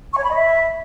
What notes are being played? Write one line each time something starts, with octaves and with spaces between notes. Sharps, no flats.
C#6
C#5
B5
D#5
E5